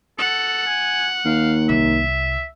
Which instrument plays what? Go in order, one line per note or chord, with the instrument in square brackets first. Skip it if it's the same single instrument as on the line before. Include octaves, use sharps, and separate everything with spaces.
[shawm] A4 [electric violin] F#5
[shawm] G#5
[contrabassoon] D#2 [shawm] F5
[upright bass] C2 [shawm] E5